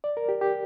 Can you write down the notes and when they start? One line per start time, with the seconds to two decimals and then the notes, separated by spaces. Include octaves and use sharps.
0.04 D5
0.17 A#4
0.29 G4
0.41 G4